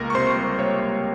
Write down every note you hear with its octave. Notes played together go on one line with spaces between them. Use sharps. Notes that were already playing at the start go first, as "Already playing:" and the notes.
Already playing: C#2 A#3 A#4 A#5
C#6
C3 C5 C6
G3
A#3 C#5 C#6
C#2